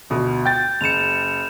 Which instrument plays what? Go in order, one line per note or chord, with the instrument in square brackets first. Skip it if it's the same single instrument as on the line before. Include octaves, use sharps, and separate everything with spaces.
[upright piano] D2 B2
[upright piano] G5 A6 [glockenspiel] G6
[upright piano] F#1 C#7 [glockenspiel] E7 F7